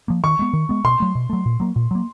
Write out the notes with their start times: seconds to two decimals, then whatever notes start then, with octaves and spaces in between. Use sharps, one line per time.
0.08 F3 A#3
0.24 D#3 C#6
0.39 G#3 B3
0.53 D#3
0.69 G#3 B3
0.84 B2 C6
1.00 F#3 A3
1.15 B2
1.30 F#3 A3
1.46 A#2
1.60 F#3 A#3
1.76 A#2
1.91 F#3 A#3